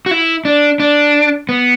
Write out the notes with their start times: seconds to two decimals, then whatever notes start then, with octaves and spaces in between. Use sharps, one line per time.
0.06 F#4
0.11 E4
0.45 D4
0.80 D4
1.49 B3